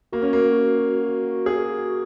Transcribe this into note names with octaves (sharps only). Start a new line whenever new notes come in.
A#3 F#4
C#4
A#3
G#4